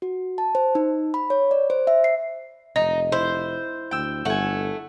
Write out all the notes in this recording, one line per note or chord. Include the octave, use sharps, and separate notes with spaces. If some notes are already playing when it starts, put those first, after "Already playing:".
F#4
A5
C5
D#4
B5
C#5
D5
C5
E5
C7
F1 D#4 D#5
E4 C5
D2 G5 E6
G1 A3 F#5 G#5